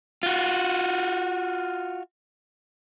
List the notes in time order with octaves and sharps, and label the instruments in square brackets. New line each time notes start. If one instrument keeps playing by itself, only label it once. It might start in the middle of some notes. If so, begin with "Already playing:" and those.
[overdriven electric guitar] F4 F#4